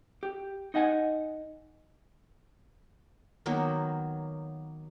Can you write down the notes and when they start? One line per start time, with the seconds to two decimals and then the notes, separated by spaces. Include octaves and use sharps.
0.23 G4
0.74 D#4 D#5 F#5 G#5
3.46 D#3 F#3 A#3 B3